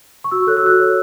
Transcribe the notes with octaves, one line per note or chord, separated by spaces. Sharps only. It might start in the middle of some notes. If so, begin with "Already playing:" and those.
C#6
F#4 E6
A4 C#5 F#6
E6
F#4 F#6
A4 C#5